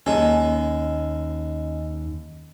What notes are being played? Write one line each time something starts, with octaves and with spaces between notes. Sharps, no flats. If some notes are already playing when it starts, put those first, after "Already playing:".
D#2 G#3 C#4 A4 G#5